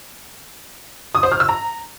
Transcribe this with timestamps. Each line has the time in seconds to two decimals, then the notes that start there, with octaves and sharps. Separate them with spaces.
1.15 D#6
1.23 C5
1.32 F6
1.40 E6
1.49 A#5